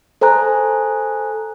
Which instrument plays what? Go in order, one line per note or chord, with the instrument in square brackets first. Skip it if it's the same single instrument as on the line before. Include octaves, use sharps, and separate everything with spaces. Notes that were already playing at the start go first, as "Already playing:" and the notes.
[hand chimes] A4 C5 G#5 A#5 F#6